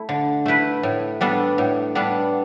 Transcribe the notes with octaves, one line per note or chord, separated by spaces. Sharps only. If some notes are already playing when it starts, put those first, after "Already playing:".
Already playing: A3 E4
D3
A3 E4 B4
A2
G3 B3 D4 A4
A2
G3 B3 D4 A4